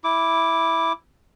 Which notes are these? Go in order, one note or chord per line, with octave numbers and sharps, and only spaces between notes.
E4 D6